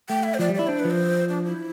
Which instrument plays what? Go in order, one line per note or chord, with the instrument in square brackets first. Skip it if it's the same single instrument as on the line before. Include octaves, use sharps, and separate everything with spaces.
[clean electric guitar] A3 [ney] G5
[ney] E5
C5
[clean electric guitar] F3 [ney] D5
[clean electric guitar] G3
[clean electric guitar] E4 [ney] D5
[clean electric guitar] D4 [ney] C5
[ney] B4
[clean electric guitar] F3
[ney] C5
D4
E4